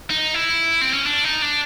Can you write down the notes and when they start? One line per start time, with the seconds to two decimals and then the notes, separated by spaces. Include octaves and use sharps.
0.10 D#4
0.34 E4
0.81 C4
0.93 C#4
1.06 D4
1.24 D#4
1.42 D4